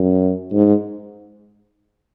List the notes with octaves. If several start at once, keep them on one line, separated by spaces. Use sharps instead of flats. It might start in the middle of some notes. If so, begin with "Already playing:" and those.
Already playing: F#2
G#2